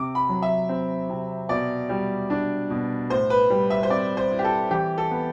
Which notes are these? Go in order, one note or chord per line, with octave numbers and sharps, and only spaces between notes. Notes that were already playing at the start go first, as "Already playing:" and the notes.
Already playing: C3 D6
B5
F#3
E5
C4
C3
B2 D5
G3
D4
B2
A2 C5
B4
G3
E5
C5
C4 D5
C5
E4
G4
A4
E3 G4
A4
B3